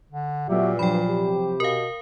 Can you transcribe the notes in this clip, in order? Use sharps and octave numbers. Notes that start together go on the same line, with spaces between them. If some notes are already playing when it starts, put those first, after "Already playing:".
D3
A#2 F#3 A3 B3 F#4 G4 E5
G2 F3 F#3 C5 G5 B5
C3 G4
B2 A#4 F5